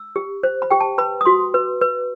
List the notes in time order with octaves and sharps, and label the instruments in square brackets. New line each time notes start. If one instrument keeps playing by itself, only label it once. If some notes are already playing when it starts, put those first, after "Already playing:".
Already playing: [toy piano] E6
G4
C5
B5
G4 G5
A5
B4 B5
D#6
F#4 C6
B4
B4